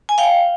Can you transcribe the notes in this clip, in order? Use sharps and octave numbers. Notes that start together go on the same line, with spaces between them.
G#5
F5 G5